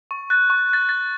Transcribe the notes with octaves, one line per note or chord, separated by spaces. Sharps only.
C#6
F#6 A6
C#6
F#6 A6
A6